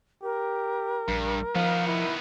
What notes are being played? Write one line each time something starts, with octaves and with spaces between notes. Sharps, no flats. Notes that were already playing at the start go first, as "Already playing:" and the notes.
G4 A#4
A#1 G2
D#3 F3 B3 F5
E4